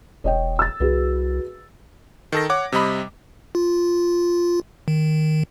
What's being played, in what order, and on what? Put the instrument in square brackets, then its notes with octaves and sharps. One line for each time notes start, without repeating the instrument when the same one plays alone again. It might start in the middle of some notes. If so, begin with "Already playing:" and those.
[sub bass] E1 [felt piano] C#5 D#5 G5
[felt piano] E6 A6
[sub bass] C2 [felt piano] F#4 G#4 B4
[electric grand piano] D#3 A4 A#6
C#5 F#5 D6
C3 G3 D#5 B5
[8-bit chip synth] F4
D#3